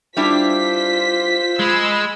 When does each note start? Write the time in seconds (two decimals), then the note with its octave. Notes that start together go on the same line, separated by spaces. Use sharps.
0.17 G3 D4 E4 F4 C5 B6
1.60 G#3 B5 E6